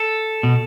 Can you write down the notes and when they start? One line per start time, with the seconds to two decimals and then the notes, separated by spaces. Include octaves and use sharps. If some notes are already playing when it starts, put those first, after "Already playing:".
Already playing: A4
0.43 B2